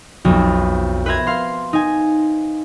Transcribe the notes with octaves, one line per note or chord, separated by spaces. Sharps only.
B1 F2
B4 C5 E5 A#5 G#6
F5 C6
D#4 G#5